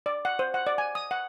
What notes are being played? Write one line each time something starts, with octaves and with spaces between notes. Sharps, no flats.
D5
F#5
C5
F#5
D5
G#5
D#6
F#5